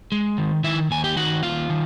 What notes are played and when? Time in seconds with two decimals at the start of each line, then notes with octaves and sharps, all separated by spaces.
0.12 G#3
0.38 D#3
0.64 D#3 E4 E5
0.91 D#2 G#5
1.04 G4 G5
1.17 D#3 F#4 F#5
1.43 D#2 F4 F5
1.70 D#3